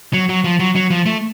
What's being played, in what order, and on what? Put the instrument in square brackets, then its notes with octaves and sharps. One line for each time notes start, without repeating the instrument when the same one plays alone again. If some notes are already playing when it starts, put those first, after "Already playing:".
[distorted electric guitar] F#3
F#3
F3
F#3
F#3
F3
A3